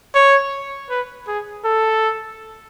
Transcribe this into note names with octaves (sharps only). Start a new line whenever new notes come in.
C#5
B4
G#4
A4